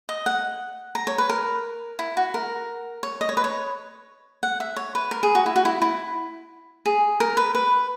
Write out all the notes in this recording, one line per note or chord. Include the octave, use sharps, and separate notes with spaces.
D#5
F#5
A#5
C#5
B4
A#4
E4
F#4
A#4
C#5
D#5
C#5
B4
C#5
F#5
E5
C#5
B4
A#4
G#4
F#4
E4
F#4
E4
E4
G#4
A#4
B4
B4